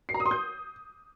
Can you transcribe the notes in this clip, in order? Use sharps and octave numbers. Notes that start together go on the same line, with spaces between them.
C7
A#5
D#6
C6
G6